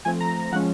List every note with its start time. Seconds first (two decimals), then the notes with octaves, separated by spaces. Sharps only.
0.05 F3 A3 C4 G#5
0.20 A#5
0.52 F3 G#3 C#4 F#5